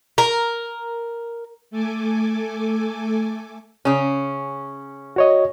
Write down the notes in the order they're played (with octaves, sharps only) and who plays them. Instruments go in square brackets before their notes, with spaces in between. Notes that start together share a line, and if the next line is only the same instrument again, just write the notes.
[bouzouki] A#4
[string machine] A3 A4 G#5 D6
[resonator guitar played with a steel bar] C#3 C#4
[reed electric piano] F#4 C#5 D#5